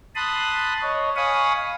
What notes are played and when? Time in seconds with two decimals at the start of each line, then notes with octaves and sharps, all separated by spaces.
0.15 A5 B5 C6 D#6 F#6
0.82 C#5 D#5
1.16 F5 G#5 B5 C#6 D#6